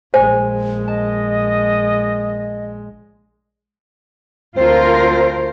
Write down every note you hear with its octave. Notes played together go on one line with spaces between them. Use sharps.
A#1 G#3 C5 G#5
D#5 A5
D2 C4 F4 A#4 C5